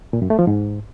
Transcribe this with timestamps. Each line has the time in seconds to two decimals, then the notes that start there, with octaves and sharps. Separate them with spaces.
0.13 A#2
0.22 F#2
0.30 A3
0.39 F3
0.47 G#2